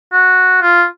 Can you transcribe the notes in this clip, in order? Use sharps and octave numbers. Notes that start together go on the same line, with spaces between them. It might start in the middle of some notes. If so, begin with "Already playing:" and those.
F#4
F4